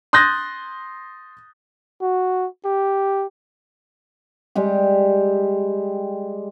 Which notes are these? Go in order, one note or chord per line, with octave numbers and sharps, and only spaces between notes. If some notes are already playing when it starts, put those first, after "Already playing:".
C6 D#6 F#6 G6 A6 A#6
F#4
G4
G3 G#3 G4